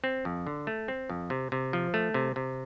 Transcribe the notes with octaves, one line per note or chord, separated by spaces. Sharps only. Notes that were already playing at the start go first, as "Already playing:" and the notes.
C4
F2
D3
A3
C4
F2
C3
C3
F3
A3
C3
C3